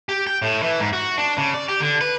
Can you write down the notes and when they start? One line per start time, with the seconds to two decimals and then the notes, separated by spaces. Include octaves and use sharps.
0.09 G4
0.27 G5
0.42 A2
0.62 E3
0.80 G#2
0.93 F#4
1.18 D4
1.37 C#3
1.54 D5
1.69 G4
1.80 D3
2.01 B4